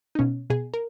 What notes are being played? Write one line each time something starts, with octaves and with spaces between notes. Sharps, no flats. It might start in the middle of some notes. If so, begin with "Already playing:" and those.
D#4
B2 C#4
B2 G#4
A#4